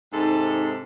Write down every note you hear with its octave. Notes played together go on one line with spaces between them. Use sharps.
G#2 C3 D#4 A4